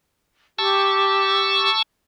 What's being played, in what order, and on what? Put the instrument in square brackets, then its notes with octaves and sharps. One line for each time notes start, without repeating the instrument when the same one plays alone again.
[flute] G4 [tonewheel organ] A5 C#6 E6